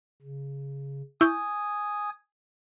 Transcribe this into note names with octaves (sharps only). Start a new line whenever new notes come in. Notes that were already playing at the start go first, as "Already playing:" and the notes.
C#3
E4 G#5 C#6 D#6 G6 G#6